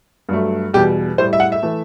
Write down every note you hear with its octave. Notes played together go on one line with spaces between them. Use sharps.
G2 F#3 A3
E2 B2 G3 G4
A2 G3 C5
E5
F#5
E5
E3 A3